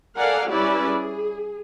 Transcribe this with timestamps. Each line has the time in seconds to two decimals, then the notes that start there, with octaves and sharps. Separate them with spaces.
0.17 A4 A#4 D5 F5 F#5 G#5
0.49 G3 C#4 E4 G4 B4 D5
0.89 G#4